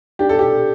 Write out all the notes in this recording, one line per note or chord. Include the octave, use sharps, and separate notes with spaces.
D4 G4
A4
G4